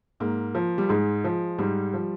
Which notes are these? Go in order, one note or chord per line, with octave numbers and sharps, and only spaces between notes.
G#2 A#3
F3
G3
G#2 G#3
F3
G#2 G3
F3